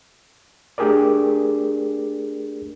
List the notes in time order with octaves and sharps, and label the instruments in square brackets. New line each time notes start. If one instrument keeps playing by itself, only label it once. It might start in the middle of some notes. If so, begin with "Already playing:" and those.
[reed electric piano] A3 D4 G4 G#4 A#4 D5